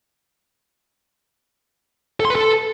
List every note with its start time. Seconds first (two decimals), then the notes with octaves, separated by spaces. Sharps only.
2.20 A4
2.25 C6
2.30 B4
2.35 A4